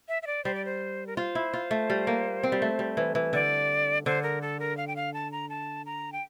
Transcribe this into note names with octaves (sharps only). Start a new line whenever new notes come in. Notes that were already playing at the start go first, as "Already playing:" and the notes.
E5
E5
D5
G3 C5
D5
C5
A#4
F4 C5
E4
F4
A3
G3
A#3
C4
G3
A3
G3
E3
E3
D3 D5
D3 C5
A#4
A4
A#4
F5
G5
F5
A5
A#5
A5
A#5
G5